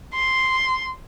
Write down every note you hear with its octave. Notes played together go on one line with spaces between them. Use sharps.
C6